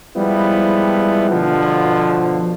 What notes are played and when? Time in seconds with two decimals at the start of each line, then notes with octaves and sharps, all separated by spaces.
0.16 F3 G3 G#3 B3 E4
1.30 B2 D3 F3